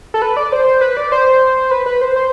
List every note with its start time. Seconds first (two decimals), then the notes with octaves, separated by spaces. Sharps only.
0.14 A4
0.22 B4
0.37 D5
0.52 C5
0.81 B4
0.97 D5
1.12 C5
1.71 B4
1.86 B4
2.01 C5
2.16 C5